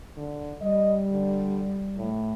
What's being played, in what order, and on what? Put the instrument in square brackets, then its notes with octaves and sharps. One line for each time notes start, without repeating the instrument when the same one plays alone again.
[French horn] D3
[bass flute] G3 [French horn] D#5
[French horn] D3
A2